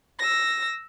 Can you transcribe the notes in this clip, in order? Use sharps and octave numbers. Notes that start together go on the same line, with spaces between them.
E6 A#6